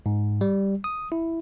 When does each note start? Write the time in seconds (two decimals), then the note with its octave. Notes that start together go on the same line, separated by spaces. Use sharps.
0.06 G#2
0.41 G3
0.84 D#6
1.12 E4